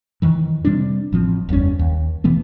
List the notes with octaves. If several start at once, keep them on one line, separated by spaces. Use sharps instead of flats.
F2 D#3 E3
C3 G3 C4 D4
A1 F3 G3 C4
F#1 E2 G3 C#4
D#2
B2 E3 A3 B3